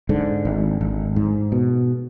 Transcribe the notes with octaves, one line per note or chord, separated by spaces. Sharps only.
G#2 D3
G#1
G#1
G#2
B2